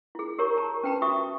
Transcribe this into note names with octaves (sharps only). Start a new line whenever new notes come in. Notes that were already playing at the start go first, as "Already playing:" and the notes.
E4 G#4
G4 A#4 C#5 A#5 C#6
A5 A#5
C#4 B4 G5 A5 B5
F#4 E5 C#6 D#6